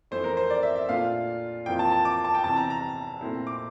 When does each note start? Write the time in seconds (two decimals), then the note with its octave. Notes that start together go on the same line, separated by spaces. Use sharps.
0.11 F2 E3 A3 E4 C5
0.24 A#4
0.37 C5
0.50 D5
0.63 E5
0.76 E5
0.89 A#2 A3 D4 F4 F5
1.66 F2 E3 A#3 F4 G5
1.79 A5
1.92 A5
2.05 D6
2.24 A5
2.35 G5
2.44 E2 C3 E3 A5
2.56 A#5
2.70 A#5
3.21 A#2 A3 C4 E4
3.47 D6